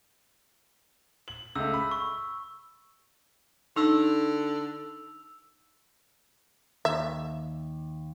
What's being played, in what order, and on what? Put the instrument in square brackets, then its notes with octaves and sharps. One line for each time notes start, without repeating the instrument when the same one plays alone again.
[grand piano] F#7
[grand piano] C#2 A3 [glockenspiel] E6
[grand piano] B5
[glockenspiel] C#6
[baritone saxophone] D3 [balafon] D#4 [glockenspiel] E6 F7
[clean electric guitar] D#2 [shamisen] E5